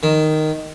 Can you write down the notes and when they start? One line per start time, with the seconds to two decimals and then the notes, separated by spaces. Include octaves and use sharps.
0.03 D#3